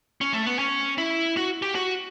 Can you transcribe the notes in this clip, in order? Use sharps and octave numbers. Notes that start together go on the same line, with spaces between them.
C#4
A3
B3
C#4
E4
F#4
G4
F#4